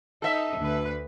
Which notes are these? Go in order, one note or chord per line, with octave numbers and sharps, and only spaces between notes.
D#4 A4 E5
D2 B4